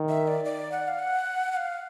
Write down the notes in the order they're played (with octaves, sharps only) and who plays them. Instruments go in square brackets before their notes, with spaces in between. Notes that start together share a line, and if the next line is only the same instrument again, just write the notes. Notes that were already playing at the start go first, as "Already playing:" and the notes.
Already playing: [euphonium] D#3
[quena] E5
D5
D5
F#5
F5
F#5
F#5
F5